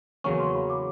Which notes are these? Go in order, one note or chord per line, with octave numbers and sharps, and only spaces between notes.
E2 C#3 F#3 A#3 C#4 C#6
C6
B5
D6